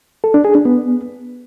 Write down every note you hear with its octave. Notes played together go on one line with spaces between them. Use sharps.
A4
D4
G#4
D4
B3